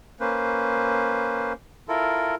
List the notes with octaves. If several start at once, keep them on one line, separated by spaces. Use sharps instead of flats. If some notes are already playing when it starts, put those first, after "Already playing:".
A#3 C#4 B4 C5
E4 F4 A4 A#4